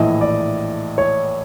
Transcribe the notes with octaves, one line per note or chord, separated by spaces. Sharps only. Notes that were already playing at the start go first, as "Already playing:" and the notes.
Already playing: A#1 A2 E3 D#5
D5
C#5